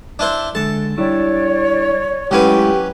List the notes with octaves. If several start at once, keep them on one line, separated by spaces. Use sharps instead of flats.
D4 E4 C5
D3 G#3 A4 A5
G3 D4 E4 C#5 D5 C#6
F#3 G#3 A3 C#4 E4 G4 B4